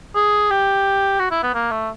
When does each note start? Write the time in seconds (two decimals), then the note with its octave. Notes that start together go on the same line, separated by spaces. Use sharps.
0.15 G#4
0.51 G4
1.19 F#4
1.31 E4
1.43 B3
1.54 A#3
1.71 A3